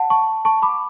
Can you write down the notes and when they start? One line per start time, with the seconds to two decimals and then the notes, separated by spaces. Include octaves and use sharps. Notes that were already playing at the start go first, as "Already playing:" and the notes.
Already playing: F#5 A5
0.10 A5 C#6
0.45 A5 C#6
0.62 B5 D6